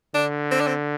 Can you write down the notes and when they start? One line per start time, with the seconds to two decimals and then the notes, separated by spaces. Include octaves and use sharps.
0.14 D3 D4
0.51 C4
0.60 D4
0.67 C4